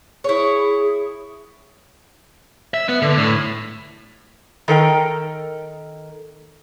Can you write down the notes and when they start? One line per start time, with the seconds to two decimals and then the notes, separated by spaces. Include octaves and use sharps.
0.24 E4 G#4 C#5
2.74 E5
2.89 B3
3.02 D3
3.18 A2
4.68 D#3 A4 A#4 G5